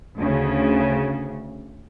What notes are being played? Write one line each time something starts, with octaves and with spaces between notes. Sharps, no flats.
D2 C#3